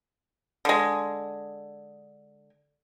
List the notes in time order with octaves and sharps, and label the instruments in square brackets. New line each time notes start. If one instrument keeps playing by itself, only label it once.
[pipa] D3 G#3